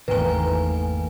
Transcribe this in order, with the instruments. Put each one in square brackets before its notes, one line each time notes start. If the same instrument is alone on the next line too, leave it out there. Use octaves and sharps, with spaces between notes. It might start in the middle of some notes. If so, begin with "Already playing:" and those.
[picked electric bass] G#1 E2 [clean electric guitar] D#3 G5 [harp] A3 A#3 [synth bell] B4 G#5